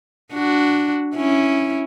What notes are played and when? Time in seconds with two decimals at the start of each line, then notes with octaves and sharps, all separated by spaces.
0.34 D4 F#4
1.16 C#4 E4